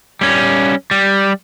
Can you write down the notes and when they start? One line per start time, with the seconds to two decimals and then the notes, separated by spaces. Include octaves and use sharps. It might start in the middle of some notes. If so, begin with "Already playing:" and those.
0.21 G3 C#4
0.91 G3